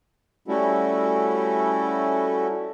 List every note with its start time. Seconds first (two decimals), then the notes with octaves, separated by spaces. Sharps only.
0.48 G3 A3 C#4 E4 F#4 A4